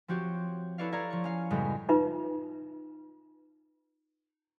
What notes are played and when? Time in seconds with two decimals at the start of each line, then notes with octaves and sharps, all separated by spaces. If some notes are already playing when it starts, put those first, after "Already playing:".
0.08 F3 C4 F#4 G4 C#5
0.78 E4 A4 B4 C#5 D5 F5
0.92 C#5 D5 F5 A#5 G#6
1.10 F3 C#6
1.24 C#4 F5
1.50 F#2 A2 C#3 G3 G#3 B3
1.89 D#4 F4 B4 E5